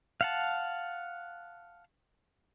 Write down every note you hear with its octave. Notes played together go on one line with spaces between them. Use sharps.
F5 F#5 A5